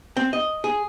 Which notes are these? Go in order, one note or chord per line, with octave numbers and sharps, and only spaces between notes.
C4
D#5
G#4